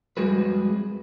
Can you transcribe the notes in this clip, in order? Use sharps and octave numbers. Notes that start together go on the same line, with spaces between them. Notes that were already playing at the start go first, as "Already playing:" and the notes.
F2 G3 G#3 F#4 G#4 B4